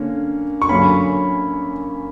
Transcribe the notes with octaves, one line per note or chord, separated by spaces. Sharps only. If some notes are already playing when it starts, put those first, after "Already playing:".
Already playing: D3 A#3 C#4
C#6
F#2 D3 A#3 C#4 B5